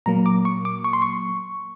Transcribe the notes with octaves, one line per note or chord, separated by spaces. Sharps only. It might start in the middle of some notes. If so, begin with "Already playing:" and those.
A#2 F#3 A#3 A#5
D6
C#6
D6
C#6
C6
C#6